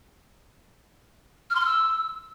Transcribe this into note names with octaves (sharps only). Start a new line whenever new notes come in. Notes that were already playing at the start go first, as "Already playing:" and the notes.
F6
C6
F6
E6